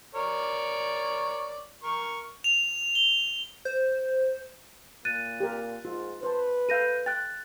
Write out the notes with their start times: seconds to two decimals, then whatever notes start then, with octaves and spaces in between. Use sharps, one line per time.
0.15 A#4 C#5 D5
1.84 A#4 C#6
2.44 F7
2.95 G7
3.65 C5
5.05 A#2 F#6 A6 D#7
5.40 G4 A#4
5.85 G#2 F4
6.23 B4 C5 A5
6.69 A4 F5 G6 A#6 D#7
7.06 G5 F#6 A6